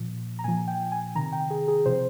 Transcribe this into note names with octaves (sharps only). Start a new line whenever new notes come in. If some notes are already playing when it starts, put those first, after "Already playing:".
Already playing: A#2 F3
A#5
A#2 F3 G#5
G5
G#5
C3 D#3 A#5
G5
G#4
G#4
C3 F3 C5